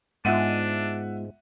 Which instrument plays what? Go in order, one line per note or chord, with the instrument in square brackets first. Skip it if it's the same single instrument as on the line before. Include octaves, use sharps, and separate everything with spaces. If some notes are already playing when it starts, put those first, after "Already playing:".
[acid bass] G#2 [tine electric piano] G#3 B3 F4 [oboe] D4 [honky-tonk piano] E5 F#5 D#7